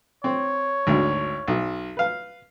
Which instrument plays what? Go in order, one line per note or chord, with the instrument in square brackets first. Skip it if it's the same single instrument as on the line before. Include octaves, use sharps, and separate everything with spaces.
[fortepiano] C4 [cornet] C#5
[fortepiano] G#1 D2
B1
B4 F5